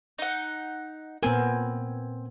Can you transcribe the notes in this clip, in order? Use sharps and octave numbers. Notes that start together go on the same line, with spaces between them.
D#4 F#5
A#2 B3 C4 A#4 G#5